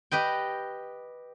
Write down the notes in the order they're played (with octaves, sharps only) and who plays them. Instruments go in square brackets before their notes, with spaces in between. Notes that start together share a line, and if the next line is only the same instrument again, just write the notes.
[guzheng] G4 B4 D#5 G5